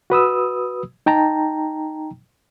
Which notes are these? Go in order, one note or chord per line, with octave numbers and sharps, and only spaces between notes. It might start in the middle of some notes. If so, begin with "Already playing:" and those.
F#4 B4 D#6 E6
D#4 G5 A5 A#5